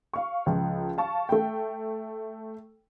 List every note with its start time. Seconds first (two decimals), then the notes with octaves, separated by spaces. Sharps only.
0.13 F5 C#6
0.46 C#2 F3
0.98 F5 A5 C#6
1.29 A3 G5